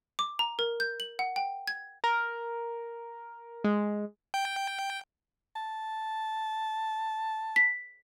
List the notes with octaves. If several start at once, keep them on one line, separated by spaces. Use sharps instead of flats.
D6
A#5
A#4
G6
F#7
F#5
G5
G#6
A#4
G#3
G5
A5
B6